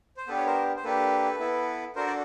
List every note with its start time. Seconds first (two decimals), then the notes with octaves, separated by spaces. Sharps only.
0.17 C5
0.28 B3 D4 G4 A4 B4
0.37 C#5
0.46 A#4 C5
0.76 C5
0.83 A#3 D4 G4 A4 B4
1.39 B3 E4 A4
1.95 D4 F#4 A4 A#4 C5
2.06 D5